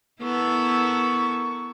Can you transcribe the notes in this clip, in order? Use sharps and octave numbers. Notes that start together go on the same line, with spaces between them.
B3 E4 A4 A#4 C#6